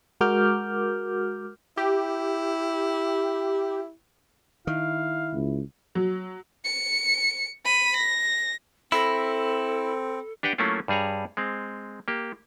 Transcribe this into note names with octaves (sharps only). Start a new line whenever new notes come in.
G#3 F#4 A#4 D6 F6 G6
E4 G4
D#3 E4 F5
C#2
F#3
C#7
B5 D#7
A#6
C4 E4 A4 B5 A#6
D4 G4 B4 F#5 G5
F#3 A3 A#3 C#4 E4 F4
G2 G3 G#4 C#5 A#5
G#3 C4
A#3 G4